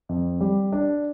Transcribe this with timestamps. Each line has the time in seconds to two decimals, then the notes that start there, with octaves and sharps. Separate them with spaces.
0.09 F2
0.41 G3
0.73 D4